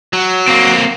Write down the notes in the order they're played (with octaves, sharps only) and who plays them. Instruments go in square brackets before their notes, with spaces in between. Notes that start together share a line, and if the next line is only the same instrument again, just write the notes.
[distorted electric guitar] F#3
[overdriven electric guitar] A#3 C4